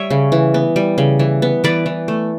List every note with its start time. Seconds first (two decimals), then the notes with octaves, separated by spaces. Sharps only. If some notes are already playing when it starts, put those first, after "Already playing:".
Already playing: G3 C#5 E5
0.10 C#3
0.32 E3
0.54 B3
0.76 G3
0.98 C#3
1.19 E3
1.42 B3
1.64 E3 B4 D5
1.86 E3
2.08 A3